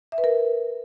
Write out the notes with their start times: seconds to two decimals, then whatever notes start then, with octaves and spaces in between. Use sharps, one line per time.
0.12 E5
0.18 B4
0.24 A#4